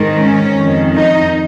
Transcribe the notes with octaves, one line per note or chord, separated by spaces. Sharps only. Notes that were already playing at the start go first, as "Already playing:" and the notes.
Already playing: G#2 D#3
C#4
F2 D#3
D#4